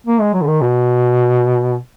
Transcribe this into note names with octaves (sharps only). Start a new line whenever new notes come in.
A#3
G#3
F#3
D3
D#3
B2